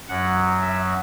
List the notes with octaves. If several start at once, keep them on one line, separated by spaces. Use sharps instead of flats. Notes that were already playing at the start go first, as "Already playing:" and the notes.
F#2 F#3 F#5
E5